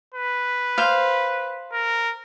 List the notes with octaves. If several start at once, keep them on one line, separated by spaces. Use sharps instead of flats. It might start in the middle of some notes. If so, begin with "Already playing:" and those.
B4
C5 F5
A#4